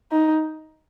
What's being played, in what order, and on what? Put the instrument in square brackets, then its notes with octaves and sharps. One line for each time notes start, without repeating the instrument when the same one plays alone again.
[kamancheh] D#4